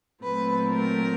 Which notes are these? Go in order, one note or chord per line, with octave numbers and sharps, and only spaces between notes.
A#2 F#3 A3 C4 B4
A#4